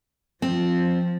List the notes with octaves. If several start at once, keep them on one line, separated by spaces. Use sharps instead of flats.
F3 C4